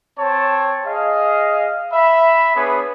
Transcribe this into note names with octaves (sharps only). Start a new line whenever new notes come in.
C4 C#5 A5
G#4 D#5 F5
E5 B5
B3 D4 G#4 B4 C#5